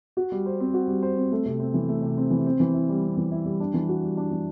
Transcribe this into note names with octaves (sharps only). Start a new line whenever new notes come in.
F#4
G3
C5
C4
F#4
G3
C5
C4
A3
C3
C4
E3
A3
C3
C4
E3
C4
E3
E4
G3
C4
E3
E4
G3
D4
E3
F#4
G3
D4
E3